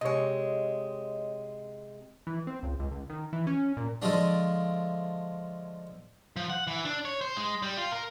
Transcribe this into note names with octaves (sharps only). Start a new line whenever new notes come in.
C3 G#3 C#5 D#5
E3
C4
C#2
C#2
C#2
D#3
E3
C#4
A#2
D3 F3 G#3 A3 D4
F3
F#5
E3
D4
C#5
C5
G#3
G3
F4
A#4